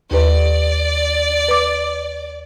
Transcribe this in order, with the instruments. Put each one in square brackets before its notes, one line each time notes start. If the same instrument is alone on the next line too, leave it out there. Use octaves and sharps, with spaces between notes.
[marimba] D#2 G4 B4 [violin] D5
[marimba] B4 D6